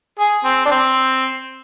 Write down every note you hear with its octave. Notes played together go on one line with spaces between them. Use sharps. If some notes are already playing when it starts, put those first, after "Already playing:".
G#4
C4
D4
C4